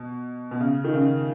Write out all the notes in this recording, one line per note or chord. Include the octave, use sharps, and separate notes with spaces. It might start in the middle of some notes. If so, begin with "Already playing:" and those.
Already playing: B2
B2
C#3
D#3
C#3